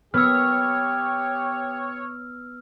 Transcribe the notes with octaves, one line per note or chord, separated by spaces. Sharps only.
B3 G4 C#5 E6 F6